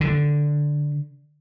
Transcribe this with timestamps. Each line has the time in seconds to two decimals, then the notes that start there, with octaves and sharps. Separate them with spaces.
0.01 D3